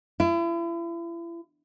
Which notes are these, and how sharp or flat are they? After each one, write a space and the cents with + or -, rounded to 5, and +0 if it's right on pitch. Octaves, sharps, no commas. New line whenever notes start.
E4 +40